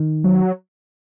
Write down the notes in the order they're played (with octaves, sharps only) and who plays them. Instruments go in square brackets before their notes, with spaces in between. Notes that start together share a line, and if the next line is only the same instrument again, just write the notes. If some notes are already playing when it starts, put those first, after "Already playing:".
Already playing: [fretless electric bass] D#3
[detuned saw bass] F#3